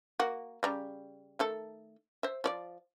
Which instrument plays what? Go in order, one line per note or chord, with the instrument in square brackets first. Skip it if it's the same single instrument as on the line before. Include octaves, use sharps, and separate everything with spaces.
[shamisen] A#3 F#4
C#3 G3 A#5
D#3 A3 A4
C5 E5
F3 C#5 D5